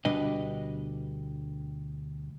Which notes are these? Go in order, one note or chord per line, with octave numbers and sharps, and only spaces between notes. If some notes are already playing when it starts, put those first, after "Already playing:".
D2 B2 G3 D4 B4 D#5